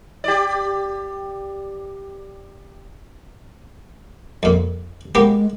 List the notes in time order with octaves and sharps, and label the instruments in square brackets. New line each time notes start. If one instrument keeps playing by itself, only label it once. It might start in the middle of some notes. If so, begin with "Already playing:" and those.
[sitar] G4 D5
[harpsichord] F2 A#2
[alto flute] G#3 [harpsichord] A#3 B3 G4